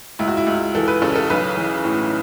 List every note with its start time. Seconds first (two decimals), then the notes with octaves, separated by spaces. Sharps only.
0.19 C#2 E4
0.28 F#4
0.37 E4
0.47 C#2
0.75 E3 A4
0.88 B4
1.02 C#3 A4
1.16 A4
1.30 B1 B4
1.57 E3
1.85 A2